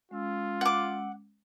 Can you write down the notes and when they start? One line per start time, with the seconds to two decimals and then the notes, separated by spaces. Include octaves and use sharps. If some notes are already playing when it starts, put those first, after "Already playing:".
0.11 G#3 C#4 F4 E6
0.61 F#5 D6